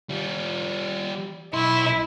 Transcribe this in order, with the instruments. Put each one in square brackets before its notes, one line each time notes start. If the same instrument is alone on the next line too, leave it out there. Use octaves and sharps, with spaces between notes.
[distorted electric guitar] G3 F4
[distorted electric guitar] B1 C6 [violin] E4